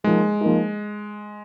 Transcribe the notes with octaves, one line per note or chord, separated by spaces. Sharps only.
F3 G#3 A#3 D#4
F3 A#3 D#4